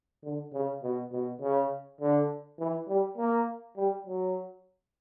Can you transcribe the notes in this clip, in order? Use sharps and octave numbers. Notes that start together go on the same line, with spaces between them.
D3
C#3
B2
B2
C#3
D3
E3
G3
A#3
G3
F#3